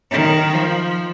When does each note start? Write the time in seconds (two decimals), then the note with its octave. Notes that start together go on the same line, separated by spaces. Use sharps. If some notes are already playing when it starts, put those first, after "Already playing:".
0.11 D#3
0.54 F3